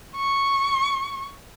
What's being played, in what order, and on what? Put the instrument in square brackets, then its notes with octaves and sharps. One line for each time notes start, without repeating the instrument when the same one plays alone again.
[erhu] C#6